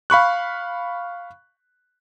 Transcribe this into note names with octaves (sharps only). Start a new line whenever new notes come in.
F5 B5 C#6 F#6